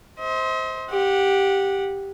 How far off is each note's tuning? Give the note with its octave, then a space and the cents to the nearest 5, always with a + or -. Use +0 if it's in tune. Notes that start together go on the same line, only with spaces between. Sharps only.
C5 +0 D#5 +45
G4 +0 F#5 -15